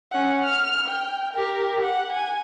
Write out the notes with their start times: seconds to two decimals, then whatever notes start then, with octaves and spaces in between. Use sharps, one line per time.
0.11 C#4 F#5
0.44 F6
0.88 G5
1.33 G4 A#4
1.81 F#5
2.12 G#5